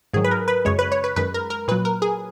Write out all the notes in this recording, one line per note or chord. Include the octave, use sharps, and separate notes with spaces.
G#2 D#3 F#3 G#4
B4
A#4
B4
F#2 C#3 G#3 C#5
B4
C#5
B4
F#2 D#3 G#3 B4
A#4
A#4
A#2 F#3 B4
A#4
G#4